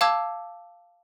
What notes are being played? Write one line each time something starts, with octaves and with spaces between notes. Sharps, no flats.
F5 A5 D6 E6 G#6